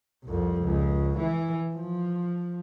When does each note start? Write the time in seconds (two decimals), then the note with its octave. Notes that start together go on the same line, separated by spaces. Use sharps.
0.24 C2 F2
0.61 C#2
1.18 E3
1.74 F3